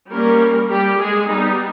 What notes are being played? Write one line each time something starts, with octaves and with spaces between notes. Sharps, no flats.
G3 A#3 C#4 A#4
G3 G4
G#3 G#4
G3 B3 D#4